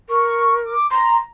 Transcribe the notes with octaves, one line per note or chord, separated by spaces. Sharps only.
A#4 C#6
D6
A#5 C6